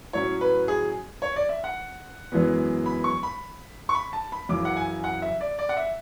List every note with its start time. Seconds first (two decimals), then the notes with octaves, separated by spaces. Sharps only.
0.13 A2 F#3 C#4 C#5
0.41 B4
0.68 G#4
1.22 C#5
1.36 D5
1.49 E5
1.64 F#5
2.32 F#2 E3 G#3 B3
2.86 B5
3.04 C#6
3.23 B5
3.89 C#6
3.95 B5
4.13 A5
4.32 B5
4.49 F#2 C#3 E3 D6
4.65 F#5
4.76 G#5
5.04 F#5
5.22 E5
5.41 D5
5.59 D5
5.69 F#5
5.77 E5